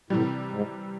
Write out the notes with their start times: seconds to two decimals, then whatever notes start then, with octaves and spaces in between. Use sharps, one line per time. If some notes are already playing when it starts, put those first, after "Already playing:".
0.10 A2 C3 E3 G3
0.50 G#2